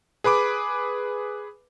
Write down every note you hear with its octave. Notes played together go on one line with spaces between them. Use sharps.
G#4 B4 B5 D6